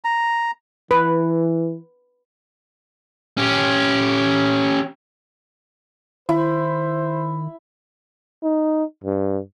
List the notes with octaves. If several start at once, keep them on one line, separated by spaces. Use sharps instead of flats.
A#5
E3 B4
C#4 G4
D#3 E4 C5
D#4
G2